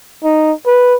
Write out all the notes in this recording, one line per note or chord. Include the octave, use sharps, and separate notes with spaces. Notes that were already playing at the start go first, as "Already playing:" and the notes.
D#4
B4